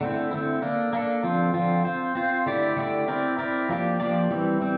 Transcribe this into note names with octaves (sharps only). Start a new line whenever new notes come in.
D3 A3 C4 E4
D3 A3 C4 E4
A#3 D4 A4
A#3 D4 A4
D3 F3 C4 F4
D3 F3 C4 F4
C4 F4 C5
C4 F4 C5
D3 A3 E4 G4 D5
D3 A3 E4 G4 D5
C4 E4 A#4 D5
C4 E4 A#4 D5
F3 A#3 D4 G4 D5
F3 A#3 D4 G4 D5
E3 G3 C4
E3 G3 C4